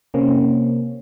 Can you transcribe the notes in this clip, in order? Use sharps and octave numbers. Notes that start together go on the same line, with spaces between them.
C3 A#3 C4 C#4